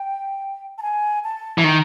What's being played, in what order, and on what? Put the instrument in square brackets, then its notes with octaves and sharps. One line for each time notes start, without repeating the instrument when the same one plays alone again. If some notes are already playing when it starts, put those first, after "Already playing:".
Already playing: [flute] G5
A5
G#5
A5
[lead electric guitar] E3
[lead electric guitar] D#3 [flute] A#5